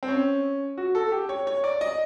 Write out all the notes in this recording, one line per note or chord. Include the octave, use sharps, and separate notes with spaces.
C4
C#4
F#4
A4
G4
C#5
C#5
D5
D#5